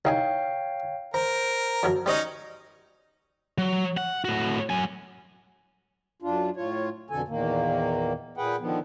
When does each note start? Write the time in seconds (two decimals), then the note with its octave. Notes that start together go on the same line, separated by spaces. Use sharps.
0.05 C2 D#4 C#5 F5 G5 G#5
1.14 A#4 C5 A#5
1.83 F#2 F3 F#3
2.06 G3 C#4 D#4 C5 D#5
3.58 F#3
3.97 F#5
4.25 A2 F#4
4.70 F#3 G#5
6.22 F#2 D4 F4
6.56 A2 F4 C#5
7.10 F2 B2 D3 A4 G#5
7.28 E2 A#2 D#3 A#3
8.37 A#2 G#4 B4 F#5 G5
8.60 D3 D#3 F3 B3